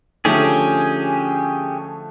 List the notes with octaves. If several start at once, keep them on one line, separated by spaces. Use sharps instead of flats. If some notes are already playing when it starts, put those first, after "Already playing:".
D3 F3 A3 C#4 G4 G#4